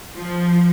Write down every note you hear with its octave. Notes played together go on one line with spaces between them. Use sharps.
F3